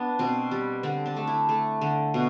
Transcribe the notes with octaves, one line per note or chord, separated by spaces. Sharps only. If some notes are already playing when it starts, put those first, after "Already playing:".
Already playing: B3 D4
B2 C4
G3
D3 C4
D4
A3
E4
A3
D3
B2